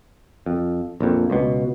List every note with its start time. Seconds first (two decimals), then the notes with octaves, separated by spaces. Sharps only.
0.46 F2
1.00 A#1 F2
1.30 C#2 B2